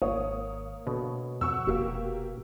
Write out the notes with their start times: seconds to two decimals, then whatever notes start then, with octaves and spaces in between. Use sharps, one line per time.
0.02 G#1 A#3 C#5 D#6
0.87 B2 D3
1.41 F2 F#5 C#6 E6
1.67 F1 A#3 F#4 G4